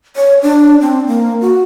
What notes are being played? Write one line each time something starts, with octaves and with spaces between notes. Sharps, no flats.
C#5
D4
C4
A#3
F#4